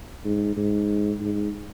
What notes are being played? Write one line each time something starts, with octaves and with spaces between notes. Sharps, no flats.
G#2
G#2
G#2